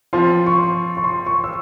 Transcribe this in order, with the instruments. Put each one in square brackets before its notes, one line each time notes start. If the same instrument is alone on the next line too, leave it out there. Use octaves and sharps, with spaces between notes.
[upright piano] F3 C4 F4 [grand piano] C6
[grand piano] C#6
C6
C#6
C6
C#6
E6